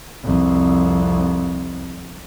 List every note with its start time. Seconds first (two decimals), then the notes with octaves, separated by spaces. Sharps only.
0.24 C2 F2